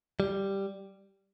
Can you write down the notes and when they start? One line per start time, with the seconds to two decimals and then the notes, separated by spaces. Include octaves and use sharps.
0.20 G3